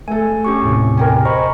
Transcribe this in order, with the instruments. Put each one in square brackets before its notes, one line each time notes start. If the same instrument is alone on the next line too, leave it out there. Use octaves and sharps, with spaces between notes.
[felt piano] A3 A4 [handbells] G#5
[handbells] C#4 G4 C#6
[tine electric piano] D#2 A2 C3
[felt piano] A#4 G5 G#5
[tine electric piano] C5 D#5 A#5 [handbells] B5 C#6